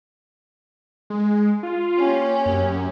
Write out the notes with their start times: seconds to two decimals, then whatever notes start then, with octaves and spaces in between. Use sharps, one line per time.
1.10 G#3
1.63 F4
1.97 A#3 C#4 G4
2.46 F#2